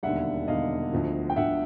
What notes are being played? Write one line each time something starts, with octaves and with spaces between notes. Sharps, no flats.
E1 D#2 D3 G3 E5 F#5
E1 D#2 D3 G3 D#5 F5
D2 D3 F3
G5
D2 D3 F3 E5 F#5